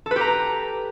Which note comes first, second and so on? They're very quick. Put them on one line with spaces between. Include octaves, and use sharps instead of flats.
A4 B4 G4 A#5